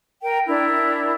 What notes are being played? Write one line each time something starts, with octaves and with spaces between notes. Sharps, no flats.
A#4 G5
D4 E4 A#4